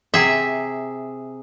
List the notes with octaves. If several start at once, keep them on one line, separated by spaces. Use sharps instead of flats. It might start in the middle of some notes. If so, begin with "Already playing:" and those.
C3 G#4 E5